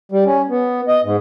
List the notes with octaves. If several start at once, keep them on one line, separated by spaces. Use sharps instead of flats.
G3
C#4
B3
D#5
G#2